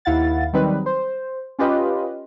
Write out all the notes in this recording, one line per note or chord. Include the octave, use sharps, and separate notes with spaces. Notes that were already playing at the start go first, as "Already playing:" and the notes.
D#2 E4 F5 F#5 A6
D#3 F#3 G3 C4 D#4 B4
C5
C#4 F4 G4 B4 D#5